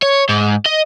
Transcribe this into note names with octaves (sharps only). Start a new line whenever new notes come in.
C#5
G#2
D#5